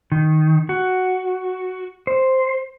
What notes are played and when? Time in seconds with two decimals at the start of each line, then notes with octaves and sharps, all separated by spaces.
0.12 D#3
0.69 F#4
2.07 C5